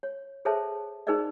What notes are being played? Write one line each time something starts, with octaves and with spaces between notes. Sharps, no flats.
C#5
G#4 A4 C5 C#5 E5 A5
D#4 G#4 A#4 C5 D5 D#5